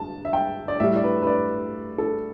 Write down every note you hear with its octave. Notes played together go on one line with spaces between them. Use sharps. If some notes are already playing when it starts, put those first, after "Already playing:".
Already playing: A5
E5
G5
D5
A2 G3 E5
D5
B4
B4
D5
A4